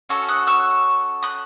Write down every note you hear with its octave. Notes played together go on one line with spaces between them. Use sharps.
C#4 F#4 A4 C#6 E6
D#6 F#6
C#6 E6
D#6 F#6